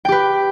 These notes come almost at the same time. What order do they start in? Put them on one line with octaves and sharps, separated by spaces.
G5 G4 B4